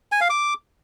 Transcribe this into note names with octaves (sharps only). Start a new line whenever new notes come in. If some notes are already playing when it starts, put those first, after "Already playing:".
G#5
F5
D6